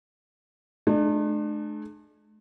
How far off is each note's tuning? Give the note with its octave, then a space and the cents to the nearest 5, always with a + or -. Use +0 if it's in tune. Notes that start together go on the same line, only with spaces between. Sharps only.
A3 -45 D4 +35